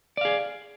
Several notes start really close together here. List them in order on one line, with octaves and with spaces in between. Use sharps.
D5 F5 G#4